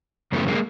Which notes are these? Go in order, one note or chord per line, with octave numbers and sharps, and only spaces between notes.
F#2 C#3 E3 A3 B3
G#3 A#3